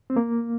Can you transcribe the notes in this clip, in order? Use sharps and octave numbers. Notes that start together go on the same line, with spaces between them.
C4
A#3